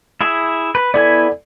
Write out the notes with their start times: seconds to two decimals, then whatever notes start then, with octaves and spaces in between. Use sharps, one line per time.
0.21 E4 G#4 E5
0.75 B4
0.94 B3 E4 A4 D5 G#5